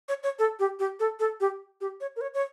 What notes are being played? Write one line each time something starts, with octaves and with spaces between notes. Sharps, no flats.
C#5
C#5
A4
G4
G4
A4
A4
G4
G4
C#5
A#4
C#5
C#5